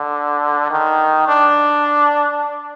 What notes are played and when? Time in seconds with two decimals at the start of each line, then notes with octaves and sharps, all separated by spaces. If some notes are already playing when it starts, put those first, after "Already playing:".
Already playing: D3
0.71 D#3
1.28 D4